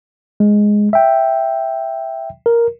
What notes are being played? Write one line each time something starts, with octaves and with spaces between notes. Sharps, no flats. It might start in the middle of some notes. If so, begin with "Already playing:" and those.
G#3
E5 G5
A#4